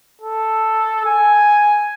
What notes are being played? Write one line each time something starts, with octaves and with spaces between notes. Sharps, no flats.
A4
G#5